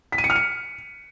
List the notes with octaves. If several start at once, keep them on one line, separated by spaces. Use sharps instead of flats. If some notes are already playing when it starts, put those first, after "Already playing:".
B6
D#7
C#7
F6
C#7